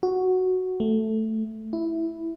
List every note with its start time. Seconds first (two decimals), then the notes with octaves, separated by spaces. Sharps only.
0.03 F#4
0.80 A3
1.73 E4